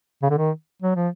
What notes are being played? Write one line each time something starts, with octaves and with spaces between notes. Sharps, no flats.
C#3
D3
D#3
F#3
F3